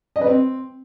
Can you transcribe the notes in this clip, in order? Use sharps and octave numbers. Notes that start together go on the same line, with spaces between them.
D#5
B4
C4